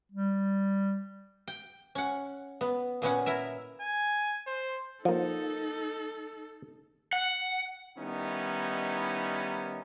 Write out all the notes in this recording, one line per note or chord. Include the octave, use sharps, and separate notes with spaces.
G3
G5
C#4 F#5
B3
A#2 B3 C#4 F#5
E4 A#4 E5
G#5
C5
F3 A#3 D#4 A4
F#5
D#3 G3 B3 C#4 D#4 E4